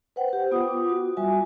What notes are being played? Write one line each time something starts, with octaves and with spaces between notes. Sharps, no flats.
B4 C5 F#5 G5
G4 B4
B3 F4 D#6
D6
F#4
G3 F4 F#4 E5 G#5